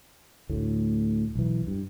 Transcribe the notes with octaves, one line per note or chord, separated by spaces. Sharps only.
D2 A2
B1 E3
G2